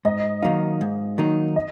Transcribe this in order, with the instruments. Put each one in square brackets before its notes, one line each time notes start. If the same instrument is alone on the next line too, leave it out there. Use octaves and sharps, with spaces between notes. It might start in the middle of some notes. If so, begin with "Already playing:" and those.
[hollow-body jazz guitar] G#2 [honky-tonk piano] D#5
[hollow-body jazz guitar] D#3 F#3 A#3 D#4 [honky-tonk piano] F5
[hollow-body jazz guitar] G#2
D#3 F#3 A#3 D#4
[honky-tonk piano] D#5